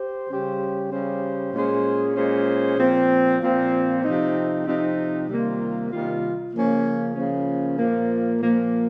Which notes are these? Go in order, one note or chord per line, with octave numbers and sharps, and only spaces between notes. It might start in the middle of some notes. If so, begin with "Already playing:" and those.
Already playing: G4 C5
C#3 G3 C#4 G4 C5
C#3 G3 C#4 G4 C5
A#2 G#3 C#4 G#4 C5
A#2 G#3 C#4 G#4 C5
A#2 F3 C4
A#2 F3 C4
C3 F3 C4 D#4
C3 F3 C4 D#4
C3 D#3 G3 A#3 F4
C3 D#3 G3 A#3 F4
C#3 F3 A#3 C#4
C#3 F3 A#3 C#4
A#2 F3 A#3
A#2 F3 A#3